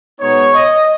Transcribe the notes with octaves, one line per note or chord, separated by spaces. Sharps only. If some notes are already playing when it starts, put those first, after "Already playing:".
B2 G#3 B3 D#4 C#5
D#5